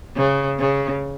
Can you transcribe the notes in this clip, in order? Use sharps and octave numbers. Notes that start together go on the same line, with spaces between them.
C#3
C#3